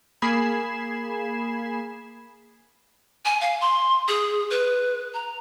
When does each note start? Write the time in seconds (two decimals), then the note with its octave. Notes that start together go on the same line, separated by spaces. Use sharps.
0.22 A#3 G#4 B5 G#6 C7 E7
3.25 G#5
3.41 F5
3.61 C6
4.08 G#4
4.50 B4
5.14 A#5